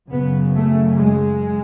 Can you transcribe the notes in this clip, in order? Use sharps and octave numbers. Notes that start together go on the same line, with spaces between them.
F#2 C#3 B3
A3
G#3